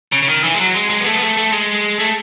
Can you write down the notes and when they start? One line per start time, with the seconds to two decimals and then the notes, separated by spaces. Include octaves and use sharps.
0.12 C#3
0.23 C#3
0.27 D#3
0.44 E3
0.54 G#3
0.59 F#3
0.74 G#3
0.90 G#3
1.00 B3
1.05 A3
1.15 B3
1.21 A3
1.37 A3
1.52 G#3
1.99 A3